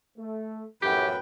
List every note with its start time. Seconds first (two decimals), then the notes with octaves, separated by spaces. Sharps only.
0.18 A3
0.82 F#2 A2 G4 B4 G5